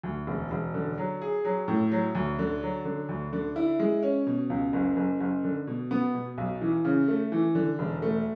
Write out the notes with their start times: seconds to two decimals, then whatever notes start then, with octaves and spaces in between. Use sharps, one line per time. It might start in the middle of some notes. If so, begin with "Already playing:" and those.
0.03 D2
0.27 E1
0.51 E1
0.74 D3
0.98 F#3
1.21 G#4
1.45 F#3
1.68 A2
1.91 F#3
2.15 D2
2.39 D3
2.62 F#3
2.85 D3
3.09 D2
3.33 D3
3.56 E4
3.79 G#3
4.03 C#4
4.27 B2
4.50 C#2
4.73 F#1
4.97 F#1
5.20 F#1
5.44 D3
5.67 B2
5.91 B3
6.14 B2
6.38 B1
6.61 E3
6.84 C#3
7.08 A3
7.32 E3
7.55 D3
7.79 E1
8.02 A3